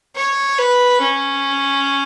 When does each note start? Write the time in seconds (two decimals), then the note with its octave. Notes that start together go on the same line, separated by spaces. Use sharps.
0.16 C#5
0.59 B4
1.01 C#4